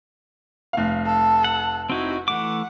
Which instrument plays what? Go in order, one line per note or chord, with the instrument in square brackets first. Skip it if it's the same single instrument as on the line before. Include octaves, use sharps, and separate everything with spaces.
[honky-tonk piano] F1 F5
[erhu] A4
[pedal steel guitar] F#5
[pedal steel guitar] C4 D#4 E4 [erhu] F#4
[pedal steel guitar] E3 A3 D6 [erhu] F#5